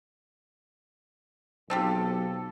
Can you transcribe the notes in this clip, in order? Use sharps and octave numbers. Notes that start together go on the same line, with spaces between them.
B1 C4 F4 G4 A4